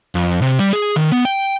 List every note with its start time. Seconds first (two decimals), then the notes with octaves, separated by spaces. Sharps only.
0.15 F2
0.42 C3
0.59 G3
0.73 G#4
0.96 D#3
1.12 B3
1.25 G5